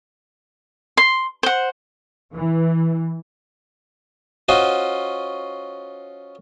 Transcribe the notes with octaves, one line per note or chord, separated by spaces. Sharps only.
C6
C5 F#5
E3
C#4 F4 F#4 C5 D#5